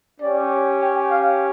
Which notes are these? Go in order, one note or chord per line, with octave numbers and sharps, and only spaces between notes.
C#4 G4 D5
G5
F5